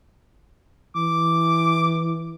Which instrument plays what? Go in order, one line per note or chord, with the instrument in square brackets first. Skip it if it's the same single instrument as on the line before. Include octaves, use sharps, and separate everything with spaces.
[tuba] E3 [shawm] D6